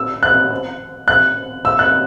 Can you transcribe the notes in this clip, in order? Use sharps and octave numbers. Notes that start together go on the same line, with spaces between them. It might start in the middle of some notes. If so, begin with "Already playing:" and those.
Already playing: E6
F#6
F#6
E6
F#6